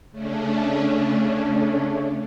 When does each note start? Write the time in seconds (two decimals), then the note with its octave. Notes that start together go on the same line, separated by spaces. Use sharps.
0.11 C#3 A3 C#4 D4